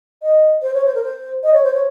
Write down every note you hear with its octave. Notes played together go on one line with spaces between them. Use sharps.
D#5
C5
C#5
C5
A#4
C5
D#5
C#5
C5
C#5